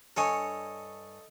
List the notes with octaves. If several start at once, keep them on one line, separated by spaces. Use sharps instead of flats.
G2 A4 C#5 D#5 G#5